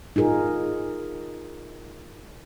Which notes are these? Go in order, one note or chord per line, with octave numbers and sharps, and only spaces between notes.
D#4 F4 G#4 A#4